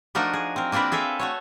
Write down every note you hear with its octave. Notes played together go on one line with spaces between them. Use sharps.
F3 A3 D4 D#4 F#4 A#4
G#4
C4 A#4
A#3 C4 D4 A#4 B4
G#4 A4 E5 F5
A3 F#4 C#5